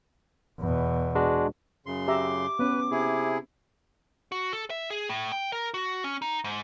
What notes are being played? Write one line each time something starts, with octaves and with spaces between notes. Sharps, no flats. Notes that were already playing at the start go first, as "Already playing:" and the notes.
E2 B2
G#3 D4 F#4
F#2 C#3 C6
G4 E5 A#5 D6
B3 C#4 B4
C3 E4 G#4
F#4
A4
E5
G#4
A2
G5
A#4
F#4
C#4
D#4
G#2